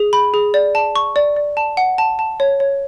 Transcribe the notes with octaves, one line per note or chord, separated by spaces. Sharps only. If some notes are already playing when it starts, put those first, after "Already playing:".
Already playing: G#4
B5
G#4
D5
A5
C#6
D5
D5
A5
F#5
A5
A5
C#5
C#5